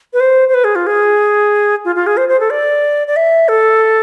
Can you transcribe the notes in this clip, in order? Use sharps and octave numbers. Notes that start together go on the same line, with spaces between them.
B4
C5
C5
B4
G#4
F4
G#4
F4
F4
G#4
C5
C5
A4
D5
D5
E5
A4